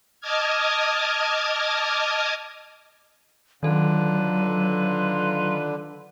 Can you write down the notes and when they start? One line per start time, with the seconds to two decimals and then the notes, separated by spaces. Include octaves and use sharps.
0.20 D#5 A5 D6 D#6 F6 G#6
3.63 D3 D#3 F#3 D#4 F4 A4 B4